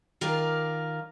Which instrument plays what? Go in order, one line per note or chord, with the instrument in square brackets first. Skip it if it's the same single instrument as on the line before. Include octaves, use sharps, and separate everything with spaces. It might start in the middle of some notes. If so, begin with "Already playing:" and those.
[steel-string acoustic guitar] D#3 F4 A#4 D5